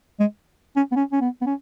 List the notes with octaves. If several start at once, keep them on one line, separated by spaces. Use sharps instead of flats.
G#3
C#4
B3
C#4
C#4
B3
B3
C#4